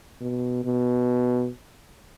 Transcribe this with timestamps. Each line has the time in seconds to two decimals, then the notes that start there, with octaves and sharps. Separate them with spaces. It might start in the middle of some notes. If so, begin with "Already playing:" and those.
0.21 B2
0.65 B2